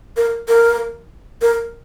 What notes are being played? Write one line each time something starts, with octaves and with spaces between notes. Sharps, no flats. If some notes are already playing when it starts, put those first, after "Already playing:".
A#4
A#4
A#4